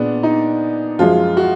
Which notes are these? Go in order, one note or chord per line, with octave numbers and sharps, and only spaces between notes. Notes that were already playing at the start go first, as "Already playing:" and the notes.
Already playing: A#2 B3 D4 G#4
D#4
F#2 F3 G#3 F4
F#4